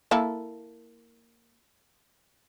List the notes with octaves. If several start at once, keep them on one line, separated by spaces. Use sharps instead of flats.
A#3 E4 A4